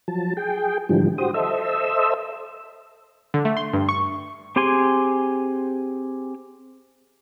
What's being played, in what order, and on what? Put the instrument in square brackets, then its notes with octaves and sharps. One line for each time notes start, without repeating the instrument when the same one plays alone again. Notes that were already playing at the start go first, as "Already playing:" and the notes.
[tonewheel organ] F3 F#3 A5
G#4 G5
G#2 D3 E3 F3 G3
F#4 G4 C5 D#6
A4 C5 D#5 E5 E6
[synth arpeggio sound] D3
A3
C6
G2
C#6
[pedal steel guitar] C4 G4 G#4 G#5 C6